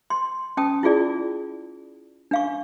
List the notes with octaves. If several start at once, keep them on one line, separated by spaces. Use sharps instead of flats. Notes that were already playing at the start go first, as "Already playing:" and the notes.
C6
C#4 G5 A5 D#6
E4 F4 G#4 D5
D4 F5 C#6